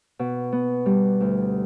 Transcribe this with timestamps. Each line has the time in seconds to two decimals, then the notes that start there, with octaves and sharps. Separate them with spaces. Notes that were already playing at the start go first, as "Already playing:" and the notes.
0.19 B2
0.52 B3
0.86 G3
1.21 D2